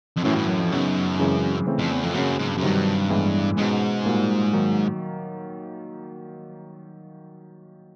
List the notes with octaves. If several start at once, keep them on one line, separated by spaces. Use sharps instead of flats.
F2
F#2 A2 E3 A3 C#4 F#4
G2
F#2
F2
F#2 C#3 F#3 B3 D#4
C#3 E3 G#3 C4
C#3 E3 A3 C4
F2
E2
F2
F#2 C#3 F#3 A#3
G#2
G2
F#2
G2 C3 D#3 F#3
A2 E3 G#3 B3 E4
G#2 B2 G#3 C#4
A#2 G3 A#3 D#4 F#4
D#3 F#3 A#3